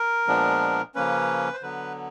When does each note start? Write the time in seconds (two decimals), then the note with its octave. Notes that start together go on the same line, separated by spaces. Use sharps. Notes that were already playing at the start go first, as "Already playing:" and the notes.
Already playing: A#4
0.27 A#2 F3 G#3 B3 D4
0.95 C#3 F3 A#3 C#4 B4
1.53 C5
1.62 D3 F#3 B3 B4